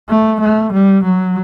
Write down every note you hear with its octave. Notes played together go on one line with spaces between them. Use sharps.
A3
A3
G3
F#3